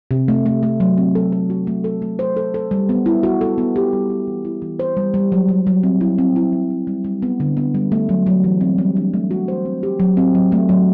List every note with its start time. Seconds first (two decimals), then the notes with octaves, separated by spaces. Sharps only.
0.11 C3
0.28 A3
0.46 A3
0.63 A3
0.80 F#3
0.98 C4
1.15 A4
1.32 A4
1.50 F#4
1.67 A3
1.84 A4
2.02 A3
2.19 C5
2.37 A4
2.54 A4
2.71 G3
2.89 B3
3.06 E4
3.23 F#4
3.41 A4
3.58 B3
3.76 G4
3.93 G3
4.10 G3
4.27 E3
4.45 E4
4.62 E3
4.79 C5
4.97 G3
5.14 G3
5.32 F#3
5.49 F#3
5.67 F#3
5.83 C4
6.01 E4
6.18 C4
6.36 E4
6.53 F#3
6.70 F#3
6.87 G3
7.05 G3
7.22 B3
7.40 D3
7.57 B3
7.75 G3
7.92 A3
8.09 F#3
8.26 F#3
8.44 E3
8.61 C4
8.78 G3
8.96 D4
9.14 A3
9.31 F#4
9.48 C5
9.65 C4
9.83 G4
10.00 F#3
10.17 C4
10.35 F#3
10.52 A3
10.69 F#3